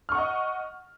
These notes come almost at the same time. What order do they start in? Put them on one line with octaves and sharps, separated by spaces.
F6 C#6 F#5 D#5